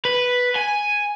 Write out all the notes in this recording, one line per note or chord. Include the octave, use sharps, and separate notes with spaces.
B4
G#5